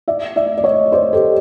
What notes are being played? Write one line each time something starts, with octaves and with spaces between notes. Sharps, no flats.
D5 E5
D5 E5
D5
C#5 D#5
C5 D5
G4 A4